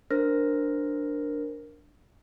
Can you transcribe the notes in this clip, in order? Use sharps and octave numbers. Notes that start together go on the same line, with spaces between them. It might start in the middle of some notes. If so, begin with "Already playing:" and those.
D4 A#4 C5 F6 A#6